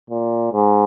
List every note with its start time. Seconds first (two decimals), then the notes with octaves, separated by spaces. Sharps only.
0.10 A#2
0.53 G#2